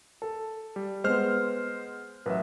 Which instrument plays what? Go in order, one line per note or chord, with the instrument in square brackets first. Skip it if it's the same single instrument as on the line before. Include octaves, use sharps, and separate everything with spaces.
[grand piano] A4
[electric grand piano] G3
[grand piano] G#3 B3 [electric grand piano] C5 F6
[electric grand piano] A1 F#3 [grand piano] B4 E5